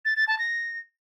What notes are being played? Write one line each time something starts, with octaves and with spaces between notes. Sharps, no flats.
A6
A6
A5
A#6